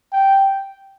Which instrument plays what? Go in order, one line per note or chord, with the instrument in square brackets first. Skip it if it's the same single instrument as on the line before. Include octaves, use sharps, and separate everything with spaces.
[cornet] G5